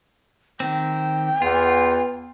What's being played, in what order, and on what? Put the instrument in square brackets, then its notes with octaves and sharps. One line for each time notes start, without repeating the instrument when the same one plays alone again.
[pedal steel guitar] D#3 C4 [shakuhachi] G5
[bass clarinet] E2 [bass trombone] B3 [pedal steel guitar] F4